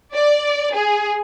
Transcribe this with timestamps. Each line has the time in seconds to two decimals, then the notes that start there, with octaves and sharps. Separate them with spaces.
0.14 D5
0.74 G#4